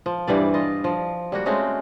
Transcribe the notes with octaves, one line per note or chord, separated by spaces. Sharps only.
F3
G2 E3 G3 D5
F4 D#5
F3
G3 A#3 F#4
G#3 A3 C4 C#4